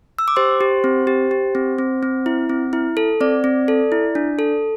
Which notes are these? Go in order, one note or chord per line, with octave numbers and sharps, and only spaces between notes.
E6
D6
G4 C5 C6
G4
C4
G4
G4
C4
C4
C4
E4
C4
E4
A4
C4 D5
C4
A4
E4
D4
A4